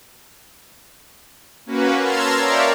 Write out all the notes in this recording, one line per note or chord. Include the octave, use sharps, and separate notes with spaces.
A#3 C#4 F#4 B4
A5 A#5 C6 E6 F6 G#6
A#4 C#5 D5 E5 F5 G5